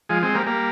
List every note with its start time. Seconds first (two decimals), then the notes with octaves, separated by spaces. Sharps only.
0.09 F3 G#3
0.23 G#3 C4
0.35 G3 A#3
0.47 G3 A#3